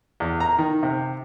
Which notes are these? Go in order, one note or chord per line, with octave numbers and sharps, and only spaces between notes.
E2
A#5
D#3
C3